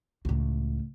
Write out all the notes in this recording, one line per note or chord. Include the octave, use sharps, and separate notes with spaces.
C#2 A2